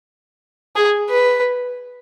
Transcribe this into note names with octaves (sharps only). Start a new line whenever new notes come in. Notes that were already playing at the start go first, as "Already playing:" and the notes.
G#4
B4